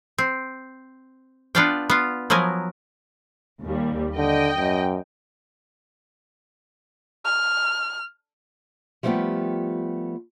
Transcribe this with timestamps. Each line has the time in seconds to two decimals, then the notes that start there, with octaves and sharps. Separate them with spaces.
0.18 C4
1.55 B3 D4 F4 D5 F5 G5
1.90 B3 F4
2.30 F3 F#3 B3 A#4 G#5
3.63 D#2 G3
4.17 D3 D#5 G5
4.57 F#2
7.25 F6
9.03 F3 G3 A3 B3 F4 G4